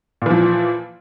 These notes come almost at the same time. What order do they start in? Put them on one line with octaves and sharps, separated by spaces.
A#2 E3 F3